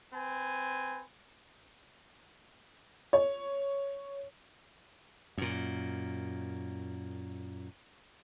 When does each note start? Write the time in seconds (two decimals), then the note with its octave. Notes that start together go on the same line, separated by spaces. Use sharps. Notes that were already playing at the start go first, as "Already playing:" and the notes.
0.14 C4 B4 G#5
3.13 C#5
5.38 F#2 A#2